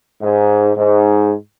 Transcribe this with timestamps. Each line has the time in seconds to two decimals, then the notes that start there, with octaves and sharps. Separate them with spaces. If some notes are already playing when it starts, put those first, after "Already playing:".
0.22 G#2
0.76 G#2